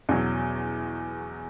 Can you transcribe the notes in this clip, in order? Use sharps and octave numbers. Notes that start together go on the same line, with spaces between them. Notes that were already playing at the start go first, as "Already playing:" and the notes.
E2 B2 F#3 C#4 G#4